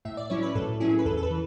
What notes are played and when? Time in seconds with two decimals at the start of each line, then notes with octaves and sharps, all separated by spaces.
0.05 A2 E5
0.17 D5
0.30 F#3 C#4 E4 C#5
0.43 B4
0.55 A2 A4
0.80 F#3 C#4 E4 G#4
0.99 B4
1.05 E2 A4
1.17 A4
1.23 B4
1.31 E3